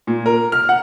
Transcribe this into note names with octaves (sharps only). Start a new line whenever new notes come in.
A#2
A#4
F6
F#5